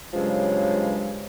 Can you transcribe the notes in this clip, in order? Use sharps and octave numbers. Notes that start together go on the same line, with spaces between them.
G2 C#3 F3 F#3 G#3